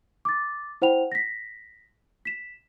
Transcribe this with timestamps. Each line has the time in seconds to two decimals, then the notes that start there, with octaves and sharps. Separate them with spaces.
0.25 D6 A6
0.82 E4 C5 F#5 G5 B5 F7
1.12 A#6 B6
2.25 B6 E7